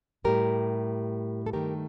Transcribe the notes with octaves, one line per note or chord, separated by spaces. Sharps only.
A2 G3 G4 A#4
A4
G2 D#3 A3 G4 A#4